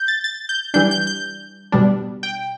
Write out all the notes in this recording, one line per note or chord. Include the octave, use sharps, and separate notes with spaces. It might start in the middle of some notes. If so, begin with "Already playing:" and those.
Already playing: G6
A6
A6
G6
E3 G3 D4 G6
G6
G6
B2 G3 D4
G5